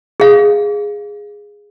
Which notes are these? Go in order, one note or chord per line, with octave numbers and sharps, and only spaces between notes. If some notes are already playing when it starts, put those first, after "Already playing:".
G#4 F5